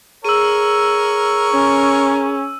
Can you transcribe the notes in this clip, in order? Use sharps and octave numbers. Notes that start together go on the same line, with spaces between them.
G#4 A#4 C#5 E6 D#7
C#4